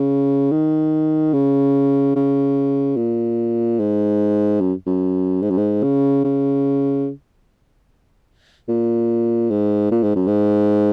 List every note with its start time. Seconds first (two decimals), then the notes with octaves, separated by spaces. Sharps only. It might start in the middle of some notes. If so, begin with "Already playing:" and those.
Already playing: C#3
0.52 D#3
1.33 C#3
2.16 C#3
2.96 A#2
3.79 G#2
4.60 F#2
4.86 F#2
5.42 G#2
5.51 F#2
5.58 G#2
5.83 C#3
6.24 C#3
8.68 A#2
9.50 G#2
9.91 A#2
10.03 G#2
10.15 F#2
10.27 G#2